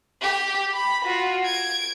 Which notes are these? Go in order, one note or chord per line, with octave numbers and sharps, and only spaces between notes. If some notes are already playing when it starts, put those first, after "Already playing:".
G4
B5
F4 F#4
G#6 D7